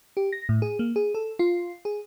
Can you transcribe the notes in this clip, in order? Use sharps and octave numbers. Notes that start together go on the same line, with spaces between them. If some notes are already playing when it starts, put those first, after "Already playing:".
G4
A#6
A2
G#4
A#3
G#4
A4
F4
G#4